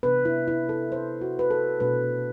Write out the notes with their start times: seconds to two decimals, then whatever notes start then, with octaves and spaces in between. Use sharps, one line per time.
0.03 C3 E3 B3 D4 B4
0.25 E4
0.48 E4
0.69 A4
0.92 C5
1.21 F#4
1.39 B4
1.51 A4
1.80 B2 A3 D4 B4